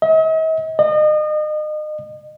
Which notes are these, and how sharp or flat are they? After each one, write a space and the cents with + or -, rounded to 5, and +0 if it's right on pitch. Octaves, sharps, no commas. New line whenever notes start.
D#5 +45
D#5 -35